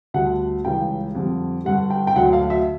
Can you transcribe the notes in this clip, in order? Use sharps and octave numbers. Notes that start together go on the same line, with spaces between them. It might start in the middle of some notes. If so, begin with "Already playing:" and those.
D2 D3 G3 F#5
C#2 C#3 E3 G3 G5
F2 D3 G3
G2 D3 G3 F#5
G5
G5
D2 D3 F#3 F#5
F5
E5